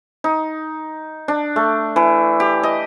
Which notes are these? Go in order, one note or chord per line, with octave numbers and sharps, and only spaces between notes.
D#4
D4
A3
E3
G4
D#5